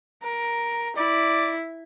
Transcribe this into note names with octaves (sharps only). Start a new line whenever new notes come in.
A#4
E4 D5